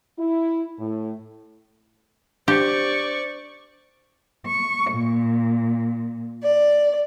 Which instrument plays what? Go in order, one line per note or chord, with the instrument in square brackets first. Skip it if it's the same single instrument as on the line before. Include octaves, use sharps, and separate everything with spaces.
[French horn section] E4
A2
[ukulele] D4 [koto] G4 [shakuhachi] C5 [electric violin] D5 C#6
[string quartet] C#6
A#2
D5